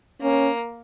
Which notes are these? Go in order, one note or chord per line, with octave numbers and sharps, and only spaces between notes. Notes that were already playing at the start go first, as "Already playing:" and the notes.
A#3 C#4